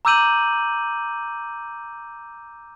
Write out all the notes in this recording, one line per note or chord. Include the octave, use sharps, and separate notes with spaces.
A#5 D6 E6 G6 D#7 F#7